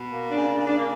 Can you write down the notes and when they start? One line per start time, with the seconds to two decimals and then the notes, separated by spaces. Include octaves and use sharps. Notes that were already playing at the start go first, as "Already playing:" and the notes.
Already playing: B2
0.11 A#3
0.29 D4
0.36 C#3
0.48 D4
0.60 C#3
0.66 D4
0.76 A#3